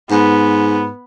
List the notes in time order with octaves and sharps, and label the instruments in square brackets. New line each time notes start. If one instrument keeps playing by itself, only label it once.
[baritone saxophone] G#2 [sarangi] B3